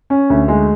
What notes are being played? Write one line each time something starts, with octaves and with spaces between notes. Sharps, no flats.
C#4
D2
G#3